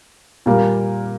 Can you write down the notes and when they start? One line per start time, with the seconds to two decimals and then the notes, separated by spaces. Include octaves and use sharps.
0.46 A#2 G3 A#3